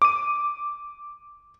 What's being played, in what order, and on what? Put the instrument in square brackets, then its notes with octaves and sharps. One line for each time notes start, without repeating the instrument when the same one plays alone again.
[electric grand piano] D6 D#7